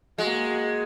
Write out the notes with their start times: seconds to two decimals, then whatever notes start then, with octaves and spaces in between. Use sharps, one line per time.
0.18 G#3 A#3 F#4